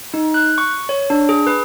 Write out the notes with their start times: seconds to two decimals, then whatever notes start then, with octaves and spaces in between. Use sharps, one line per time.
0.14 D#4
0.34 F#6
0.58 C#6
0.89 C#5
1.10 D4
1.29 G#4
1.47 B4